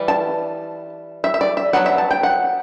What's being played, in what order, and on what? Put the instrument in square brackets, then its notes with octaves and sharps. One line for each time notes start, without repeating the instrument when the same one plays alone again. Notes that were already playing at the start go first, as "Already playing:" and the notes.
Already playing: [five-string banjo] E3 G3
A5
E5
E5
D5
E5
F#3 B3 D4 F#5
E5
A5
G5
F#5